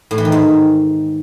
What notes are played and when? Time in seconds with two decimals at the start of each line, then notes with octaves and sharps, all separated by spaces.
0.11 A2
0.18 E3
0.25 D#3
0.32 G#2